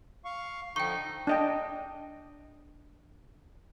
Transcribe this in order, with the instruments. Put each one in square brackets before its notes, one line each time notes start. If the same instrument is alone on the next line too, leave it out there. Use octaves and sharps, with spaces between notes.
[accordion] F5 C#6
[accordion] D3 F3 [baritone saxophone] D#4 [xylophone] G5 C#6
[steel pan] D4 D#5 G5